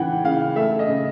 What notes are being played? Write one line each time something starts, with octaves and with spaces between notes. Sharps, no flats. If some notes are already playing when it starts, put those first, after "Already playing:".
Already playing: C#3 E3 F#5 G5
C#3 F5
A3 E5
D#5
C#3